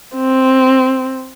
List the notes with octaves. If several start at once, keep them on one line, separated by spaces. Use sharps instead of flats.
C4